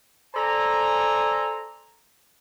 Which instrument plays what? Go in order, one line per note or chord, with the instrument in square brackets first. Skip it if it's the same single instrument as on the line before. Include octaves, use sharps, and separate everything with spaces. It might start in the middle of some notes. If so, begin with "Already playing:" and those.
[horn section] A4 C5 D5 G#5 A#5